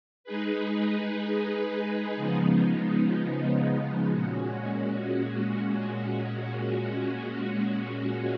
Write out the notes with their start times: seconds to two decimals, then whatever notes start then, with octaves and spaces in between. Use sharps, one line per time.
0.24 G#3 D#4 G#4 B4
2.16 C#3 F3 G#3 B3 D#4
4.08 A#2 G#3 C#4 F#4